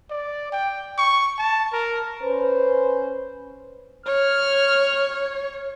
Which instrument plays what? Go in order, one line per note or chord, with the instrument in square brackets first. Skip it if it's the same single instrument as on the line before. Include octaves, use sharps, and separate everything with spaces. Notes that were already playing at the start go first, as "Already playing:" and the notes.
[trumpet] D5
G5
C#6
A5
A#4
[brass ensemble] C#4 B4 C5
[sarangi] C#5 [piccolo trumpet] F6